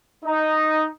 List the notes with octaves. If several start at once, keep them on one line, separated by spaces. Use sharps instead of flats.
D#4